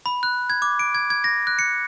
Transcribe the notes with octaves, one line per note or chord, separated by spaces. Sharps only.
B5
F#6
G#6
D6
D7
G#6
G#6
A#6
F#6
C#7